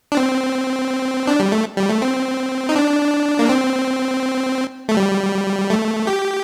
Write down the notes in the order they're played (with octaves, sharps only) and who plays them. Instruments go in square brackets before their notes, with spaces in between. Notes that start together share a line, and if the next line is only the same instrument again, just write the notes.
[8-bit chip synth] D4
C4
D4
G3
A3
G3
A3
C4
D#4
D4
A#3
C4
A3
G3
A3
G4